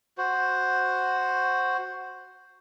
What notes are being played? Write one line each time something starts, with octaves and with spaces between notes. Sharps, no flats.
F#4 C5